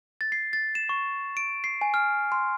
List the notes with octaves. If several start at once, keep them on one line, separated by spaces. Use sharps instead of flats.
A6
C7
A6
E7
C#6
D7
C7
G#5
F6
C6